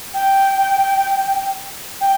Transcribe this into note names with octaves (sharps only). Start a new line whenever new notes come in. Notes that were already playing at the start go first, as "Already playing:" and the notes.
G5
G5